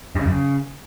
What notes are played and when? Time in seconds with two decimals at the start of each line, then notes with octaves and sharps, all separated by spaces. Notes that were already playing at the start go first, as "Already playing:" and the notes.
0.15 G2
0.21 C#3
0.26 F#2
0.31 C#3